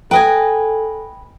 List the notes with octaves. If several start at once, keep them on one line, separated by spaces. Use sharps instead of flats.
A4 B4 D#5 G5 G#5